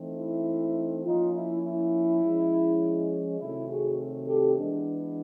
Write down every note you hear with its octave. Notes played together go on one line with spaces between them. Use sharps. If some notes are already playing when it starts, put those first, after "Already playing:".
Already playing: E3 A3 C4 D#4
E4
F3 A#3 C#4 D#4 F4
E4
E4
F3 G#3 C#4
C3 D#3 F#3 A3 C4 E4
F#4 G#4
G4 A4
E3 G#3 B3 D4